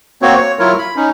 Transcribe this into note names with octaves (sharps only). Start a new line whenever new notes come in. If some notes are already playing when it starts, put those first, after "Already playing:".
A#3 C4 F#4 C#5
C#5
F#3 E4 F4 A#4 C#5
B5
C#4 D#4